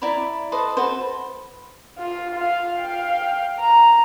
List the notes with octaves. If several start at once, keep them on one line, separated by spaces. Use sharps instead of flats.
E4 D5 A#5 B5
A4 B4 C5 D#5
F#4 A4 B4 C5
F4
F4 F5
F5 G5
A#5